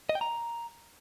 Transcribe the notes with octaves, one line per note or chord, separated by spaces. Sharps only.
D#5
G5
A#5